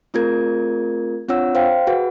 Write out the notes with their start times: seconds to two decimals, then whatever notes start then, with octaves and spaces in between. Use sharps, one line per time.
0.14 A3 C4 F4 G#4 A#4 G#6
1.29 C4 D4 F4 C#5 F#5 E6
1.55 C5 F5 G5
1.87 F#4 G#4 B4 F#5